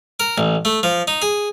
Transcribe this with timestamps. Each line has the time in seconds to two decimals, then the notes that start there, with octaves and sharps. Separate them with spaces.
0.20 A#4
0.38 A1
0.65 A3
0.83 F3
1.08 D#4
1.22 G#4